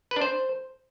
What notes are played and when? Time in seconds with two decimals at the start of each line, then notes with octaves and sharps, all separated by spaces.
0.11 B4
0.16 D4
0.21 C5